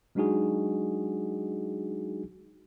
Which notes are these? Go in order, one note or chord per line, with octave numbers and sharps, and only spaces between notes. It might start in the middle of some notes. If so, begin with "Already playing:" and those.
F#3 G#3 D4 D#4 F#4 G#4